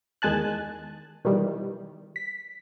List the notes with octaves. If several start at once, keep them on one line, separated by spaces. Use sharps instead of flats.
E2 D#3 G#3 G#5 A5 F#6
B2 D#3 E3 G3
B6